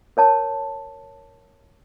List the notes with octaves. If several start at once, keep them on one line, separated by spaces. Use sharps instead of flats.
A#4 C#5 A5